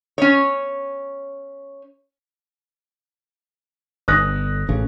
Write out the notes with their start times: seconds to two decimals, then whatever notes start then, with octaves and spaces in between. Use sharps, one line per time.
0.18 C#4 C#5
4.08 G1 D#6 F#6 A#6
4.69 A1 C#3